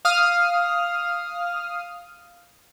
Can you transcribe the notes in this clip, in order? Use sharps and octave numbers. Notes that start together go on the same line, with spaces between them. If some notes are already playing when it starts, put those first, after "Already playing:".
F5 D#6 F6